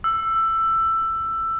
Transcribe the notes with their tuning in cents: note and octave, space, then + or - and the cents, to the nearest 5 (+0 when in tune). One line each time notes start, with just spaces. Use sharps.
E6 +15